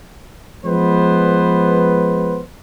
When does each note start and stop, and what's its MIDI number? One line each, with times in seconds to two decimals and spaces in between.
0.65 2.42 53
0.65 2.42 56
0.65 2.42 59
0.65 2.42 71
0.65 2.42 72